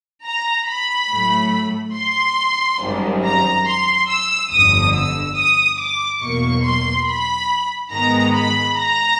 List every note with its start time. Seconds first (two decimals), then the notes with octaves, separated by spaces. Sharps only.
0.26 A#5
0.68 B5
1.11 A2 F#3 A3
1.96 C6
2.81 G#1 F#2 D#3 G3
3.24 A#5
3.66 C6
4.09 E6
4.51 G1 F2 D3 D#6
4.94 E6
5.37 D#6
5.79 D6
6.22 E2 B2 F#3 A#3 C#6
6.64 C6
7.06 B5
7.92 G#2 D#3 G#3 B3 A#5
8.35 B5
8.77 A#5